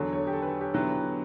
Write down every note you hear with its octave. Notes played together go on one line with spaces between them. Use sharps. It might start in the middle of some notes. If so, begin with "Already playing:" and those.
Already playing: E2 D3 F#3 A4 C#5
A4 C#5
G4
A4
B4
A4
G4
D3 F#3 B3 E4